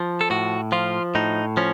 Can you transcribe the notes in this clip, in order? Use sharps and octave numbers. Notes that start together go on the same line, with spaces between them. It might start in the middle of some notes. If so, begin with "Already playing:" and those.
Already playing: F3
A4
A2 F#4
F3 F4
A2 D#4
F3 C#4